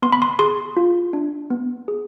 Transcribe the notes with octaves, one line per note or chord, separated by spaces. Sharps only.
B3 C6
B5
C6
G#4 C6
F4
D4
B3
G#4